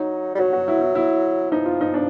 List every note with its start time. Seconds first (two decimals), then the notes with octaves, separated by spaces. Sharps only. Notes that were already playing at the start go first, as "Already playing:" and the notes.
Already playing: F#3 D#4
0.35 G3
0.39 F#3 F#4
0.53 F#4
0.68 E4
0.81 E4
0.95 E4
1.51 F3 D#4
1.65 F4
1.81 D#4
1.94 D4